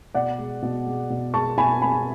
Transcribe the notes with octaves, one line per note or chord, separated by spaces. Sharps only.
B2 D5 F#5
G#3
B2
G#3
B2
G#3 A5 C#6
B2 G#5 B5
G#3 G#5 B5